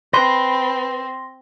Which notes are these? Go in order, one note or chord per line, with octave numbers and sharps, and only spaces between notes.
C4 B4 C6 A#6